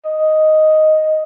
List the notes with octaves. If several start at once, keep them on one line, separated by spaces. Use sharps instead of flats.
D#5